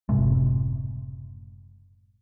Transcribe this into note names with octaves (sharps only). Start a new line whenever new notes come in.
F#1 A2 C3 G#3